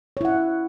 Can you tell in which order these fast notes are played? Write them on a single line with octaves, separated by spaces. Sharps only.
C#5 E4 F#5